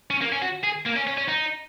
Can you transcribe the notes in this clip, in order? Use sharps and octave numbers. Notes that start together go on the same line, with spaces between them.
C#4
A#3
C#4
F#4
G#4
A#3
C#4
C#4
C#4
D#4